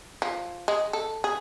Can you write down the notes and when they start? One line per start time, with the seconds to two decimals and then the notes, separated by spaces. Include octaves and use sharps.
0.22 F3
0.68 G#3
0.93 A4
1.24 G#4